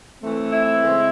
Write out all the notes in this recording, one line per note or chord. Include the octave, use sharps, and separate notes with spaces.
E3 A3 C4
E4
C#3 G#3 C4